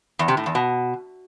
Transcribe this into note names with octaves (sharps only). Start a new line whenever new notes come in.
E2
C3
A2
E2
B2